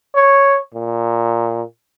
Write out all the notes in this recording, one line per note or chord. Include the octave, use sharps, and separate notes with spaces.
C#5
A#2